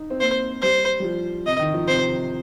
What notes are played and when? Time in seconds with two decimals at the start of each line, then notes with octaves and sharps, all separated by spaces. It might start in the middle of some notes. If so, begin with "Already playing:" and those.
Already playing: D#4
0.10 C4
0.20 A#3 C5
0.62 G3 C5
1.00 G3
1.04 F3
1.46 C3 D#5
1.59 D#3
1.74 F3
1.88 C3 C5